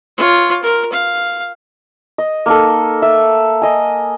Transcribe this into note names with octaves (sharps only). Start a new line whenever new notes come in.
F4 C#5
A#4
F5
D#5
A#3 D#4 A4
E5
D#5 G#5